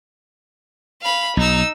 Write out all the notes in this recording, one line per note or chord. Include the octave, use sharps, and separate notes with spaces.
F5 B5
B1 D#4 E6